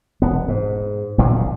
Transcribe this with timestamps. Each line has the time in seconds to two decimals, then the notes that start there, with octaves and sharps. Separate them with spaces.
0.22 E1 B3
0.48 G#2
1.18 D#1 B1 A#2 C#3